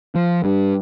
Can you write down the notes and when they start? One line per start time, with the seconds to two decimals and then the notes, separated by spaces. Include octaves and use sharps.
0.15 F3
0.44 G2